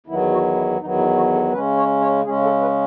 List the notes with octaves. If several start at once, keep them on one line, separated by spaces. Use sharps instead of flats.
E2 D#3 F#3 B3 E4
F#4
E4
E2 D#3 F#3 B3 D#4
E4
F#4
A4
C#3 G#3 C#4 B4
C#5
C#5
C#3 G#3 C#4 G#4
A4
B4